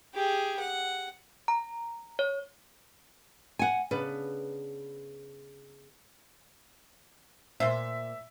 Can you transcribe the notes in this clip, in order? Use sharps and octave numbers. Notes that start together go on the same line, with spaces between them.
G4 G#4
F#5
A#5
C#5
F#5 G#5
C#3 B3 D4 B4
A#2 C5 E5